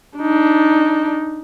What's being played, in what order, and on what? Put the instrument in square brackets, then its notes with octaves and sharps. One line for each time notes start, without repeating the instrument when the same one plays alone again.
[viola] D4 D#4